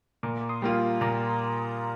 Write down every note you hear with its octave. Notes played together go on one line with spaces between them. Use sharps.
A#2 A#5 D6
C6 D#6
G3 A#3 F4
A#2 A#5 D6